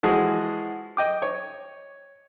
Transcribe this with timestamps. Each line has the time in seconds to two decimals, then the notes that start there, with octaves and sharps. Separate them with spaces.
0.03 E3 F3 G#3 F#4 G#4
0.97 D#5 G5 D6
1.22 C#5